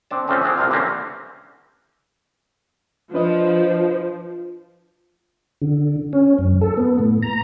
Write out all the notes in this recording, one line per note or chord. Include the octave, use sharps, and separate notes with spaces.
C4 D4 A5
D3 F3 A3 C4 C#4
C4 D4 F4 G#4
C2 C3 F4 F5
D3 E3 A#3 C4 C#4
F3 D4 B4 D#5
D3
C#4
F#2
A4
B3
A2
A#5